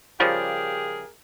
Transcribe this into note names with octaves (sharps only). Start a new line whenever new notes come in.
C#3 F3 G3 G4 G#4 A#4